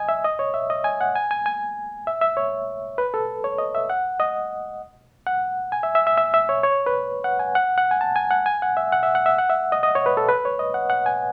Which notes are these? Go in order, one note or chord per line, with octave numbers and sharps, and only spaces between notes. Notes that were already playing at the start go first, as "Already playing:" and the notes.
Already playing: D#5 G#5
E5
D#5
C#5
E5
D#5
G#5
F#5
G#5
G#5
G#5
E5
E5
C#5
B4
A4
C#5
D#5
E5
F#5
D#5
F#5
G#5
E5
E5
E5
E5
E5
C#5
C#5
B4
F#5
G#5
F#5
F#5
G#5
A5
G#5
F#5
G#5
F#5
E5
F#5
E5
F#5
E5
F#5
E5
D#5
D#5
C#5
B4
A4
B4
C#5
D#5
F#5
F#5
G#5